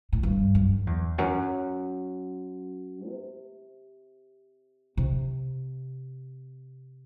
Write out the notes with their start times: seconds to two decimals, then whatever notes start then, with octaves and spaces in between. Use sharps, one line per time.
0.13 A2
0.23 G2
0.55 F#2
0.87 E2
1.18 F#2
3.09 C3
4.97 C3